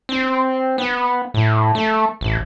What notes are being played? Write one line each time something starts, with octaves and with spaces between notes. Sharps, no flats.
C4
B3
A2
A3
A1